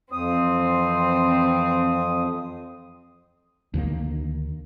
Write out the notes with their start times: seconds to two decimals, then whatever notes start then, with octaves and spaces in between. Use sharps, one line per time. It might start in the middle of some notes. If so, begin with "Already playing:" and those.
0.12 F2 E3 C4 D#6
3.74 D2 D#3 F3 A#3